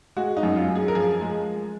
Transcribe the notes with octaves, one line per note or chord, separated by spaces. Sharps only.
G#3 F#4
D#4
F#2
F4
F#2
G#4
A#4
F3 G#4
G#3